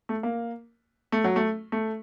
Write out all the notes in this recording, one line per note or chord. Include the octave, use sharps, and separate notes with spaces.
A3
A#3
A3
F#3
A3
A3